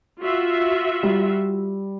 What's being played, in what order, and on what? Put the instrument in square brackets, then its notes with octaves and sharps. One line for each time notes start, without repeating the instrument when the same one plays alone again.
[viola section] F4 F#4 E5
[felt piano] G3